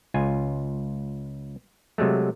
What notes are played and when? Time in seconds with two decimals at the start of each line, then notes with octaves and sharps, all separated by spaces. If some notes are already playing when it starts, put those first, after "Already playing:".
0.14 C#2 F4 G#5
1.98 C3 F#3 G#3 A3